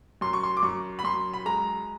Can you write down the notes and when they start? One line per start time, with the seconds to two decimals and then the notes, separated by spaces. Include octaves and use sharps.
0.21 F#2 C6
0.33 C#6
0.43 C6
0.57 D6
0.63 F#2 C#6
0.99 B5
1.04 F#2 C6
1.33 B5
1.46 G#3 A#5